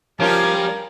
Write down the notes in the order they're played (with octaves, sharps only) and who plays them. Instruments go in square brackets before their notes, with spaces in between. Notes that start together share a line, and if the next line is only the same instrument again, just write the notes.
[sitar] F3 C#4 F4 [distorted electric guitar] G3 [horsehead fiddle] A#4 [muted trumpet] G#5